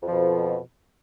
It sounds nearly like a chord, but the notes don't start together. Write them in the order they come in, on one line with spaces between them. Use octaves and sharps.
F2 F3 B2